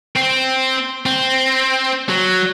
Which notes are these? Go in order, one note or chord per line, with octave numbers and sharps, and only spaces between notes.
C4
C4
F#3